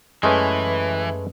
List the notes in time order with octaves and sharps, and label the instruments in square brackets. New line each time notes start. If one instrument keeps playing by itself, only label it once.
[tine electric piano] F#2 B4 [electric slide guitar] E3 [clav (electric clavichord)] G#3 A3 C#4